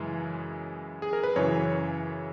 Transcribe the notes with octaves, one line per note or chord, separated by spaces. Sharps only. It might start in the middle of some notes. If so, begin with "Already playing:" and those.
Already playing: F#2 C#3 E3 G#3
G#4
A#4
B4
F#2 C#3 E3 C#5